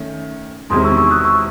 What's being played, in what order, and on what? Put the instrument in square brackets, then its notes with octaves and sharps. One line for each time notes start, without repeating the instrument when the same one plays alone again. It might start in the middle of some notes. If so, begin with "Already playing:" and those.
Already playing: [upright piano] D#3 A3 C#4
[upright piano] E1 E2 C3 D#3 G#3 [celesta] C6 D#6
[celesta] C#6 E6
C#6 E6
D#6 F#6
C#6 E6